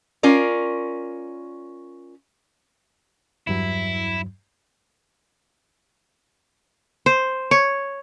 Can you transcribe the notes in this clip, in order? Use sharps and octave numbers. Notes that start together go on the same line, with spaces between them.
C#4 F4 A#4 D5
E2 G2 F#3 E4
C5
C#5